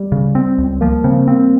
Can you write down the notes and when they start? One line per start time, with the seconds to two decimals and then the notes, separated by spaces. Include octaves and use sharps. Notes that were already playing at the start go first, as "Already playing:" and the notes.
Already playing: G3
0.12 C#3
0.35 C4
0.58 C#2
0.81 F3 A#3
1.04 C#3 C4
1.27 A#3 C4